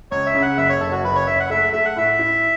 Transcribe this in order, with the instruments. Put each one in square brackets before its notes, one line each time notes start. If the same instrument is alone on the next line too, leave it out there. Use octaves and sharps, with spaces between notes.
[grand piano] C#2 [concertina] C#5
[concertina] E5
[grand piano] C#3
[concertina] F#5
[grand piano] F#1 [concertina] E5
[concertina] C#5
[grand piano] F#1 [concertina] A4
[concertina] F#4
[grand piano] F#1 [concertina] B4
[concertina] C#5
[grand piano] F#1 [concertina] E5
[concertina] F#5
[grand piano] A3 [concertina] E5
[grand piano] A3 [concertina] E5
[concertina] F#5
[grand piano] A2 [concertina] E5
[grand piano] E4